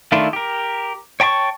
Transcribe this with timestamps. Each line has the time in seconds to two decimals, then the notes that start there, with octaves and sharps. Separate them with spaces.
0.12 D#3 A3 D4 E4 F4
0.33 G4 A#4
1.20 C#5 G5 A5 B5 C#6